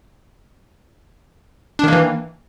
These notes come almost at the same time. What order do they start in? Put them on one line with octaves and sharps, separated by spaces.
D4 D#3 A#3 E3